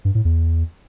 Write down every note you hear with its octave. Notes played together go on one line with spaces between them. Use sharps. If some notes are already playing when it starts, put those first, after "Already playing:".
G2
A2
E2